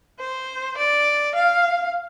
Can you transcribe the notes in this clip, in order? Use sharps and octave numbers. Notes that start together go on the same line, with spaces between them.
C5
D5
F5